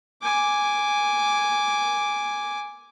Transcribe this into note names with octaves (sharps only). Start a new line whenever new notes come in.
G#5 D6